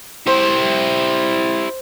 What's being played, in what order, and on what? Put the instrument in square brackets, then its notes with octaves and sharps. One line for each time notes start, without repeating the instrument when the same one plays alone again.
[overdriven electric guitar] E4 G4 [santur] C5